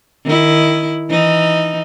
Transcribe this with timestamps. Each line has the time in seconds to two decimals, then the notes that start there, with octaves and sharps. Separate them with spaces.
0.25 D#3 E4
1.09 E3 D#4